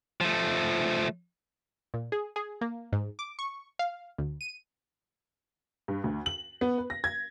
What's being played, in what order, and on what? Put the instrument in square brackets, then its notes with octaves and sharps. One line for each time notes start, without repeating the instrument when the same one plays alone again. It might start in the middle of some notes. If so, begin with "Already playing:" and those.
[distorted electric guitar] F3 A3
[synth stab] A#2
G#4
G#4
A#3
G#2
D6
C#6
F5
D2
D#7
[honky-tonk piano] G2
D2
F#7
B3
B4
A#6
G#6